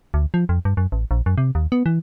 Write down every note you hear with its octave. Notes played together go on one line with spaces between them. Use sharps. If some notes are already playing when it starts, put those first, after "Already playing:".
D2
F3
F2
G2
F#2
A1
A#1
F#2
C3
D#2
B3
E3